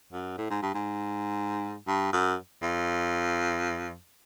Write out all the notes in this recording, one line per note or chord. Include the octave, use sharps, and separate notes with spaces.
F#2
A2
G#2
G2
G#2
G2
F#2
F2